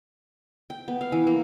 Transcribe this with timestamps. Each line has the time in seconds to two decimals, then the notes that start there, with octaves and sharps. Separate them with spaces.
0.70 G5
0.88 B3
1.01 F5
1.12 E3
1.27 A#3